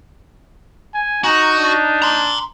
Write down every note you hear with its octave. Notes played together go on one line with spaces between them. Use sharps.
G#5
D#4 F#4 A#5
D4
A#5 C6